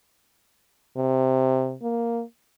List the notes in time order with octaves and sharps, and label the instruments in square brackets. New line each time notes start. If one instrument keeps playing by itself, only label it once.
[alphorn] C3
A#3